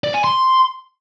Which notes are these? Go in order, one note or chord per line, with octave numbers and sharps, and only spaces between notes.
D5
G#5
C6